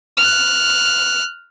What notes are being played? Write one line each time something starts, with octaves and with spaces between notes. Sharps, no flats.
F6 F#6